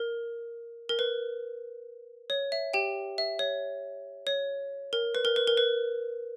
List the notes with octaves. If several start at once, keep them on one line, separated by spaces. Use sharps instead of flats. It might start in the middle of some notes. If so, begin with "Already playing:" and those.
Already playing: A#4
A#4
B4
C#5
E5
G4 G5
E5
C#5
C#5
A#4
B4
A#4
B4
A#4
B4